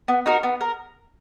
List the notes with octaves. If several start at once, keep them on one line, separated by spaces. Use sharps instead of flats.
B3
D#4 F#4 A#4
B3
A#4